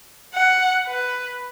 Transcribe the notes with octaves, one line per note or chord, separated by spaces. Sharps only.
F#5
B4